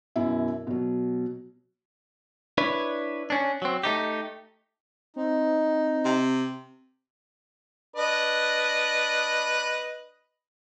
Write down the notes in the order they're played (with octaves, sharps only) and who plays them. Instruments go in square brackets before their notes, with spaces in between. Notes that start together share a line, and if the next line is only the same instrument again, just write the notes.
[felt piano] F#2 B2 E4
B2 F#3
[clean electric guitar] D4 E4 B4 C#5
C#4 D4
F#3 C4
A3 D#4 G4
[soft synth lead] C4 [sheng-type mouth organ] D#4
[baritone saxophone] C3
[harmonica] D4 B4 D#5